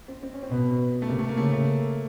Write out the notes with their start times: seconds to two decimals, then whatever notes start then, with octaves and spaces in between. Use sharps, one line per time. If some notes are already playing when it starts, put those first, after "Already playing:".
0.08 C4
0.23 C4
0.33 C#4
0.42 C4
0.51 B2 B3
1.02 A3
1.08 C3 A#3
1.19 A3
1.29 A#3
1.37 C#3 A3
1.52 A3